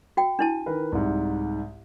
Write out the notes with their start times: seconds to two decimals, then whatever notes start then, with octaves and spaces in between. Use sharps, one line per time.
0.17 F#4 G5
0.39 D4 E4 A5
0.66 D#3 A#4 B4
0.92 C2 G#2